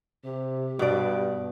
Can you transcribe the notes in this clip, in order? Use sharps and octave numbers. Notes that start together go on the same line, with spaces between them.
C3 G4
G2 B2 D5